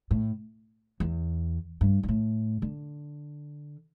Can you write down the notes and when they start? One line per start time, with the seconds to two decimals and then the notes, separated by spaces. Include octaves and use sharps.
0.11 A2
1.00 E2
1.81 G2
2.03 G2
2.08 A2
2.62 D3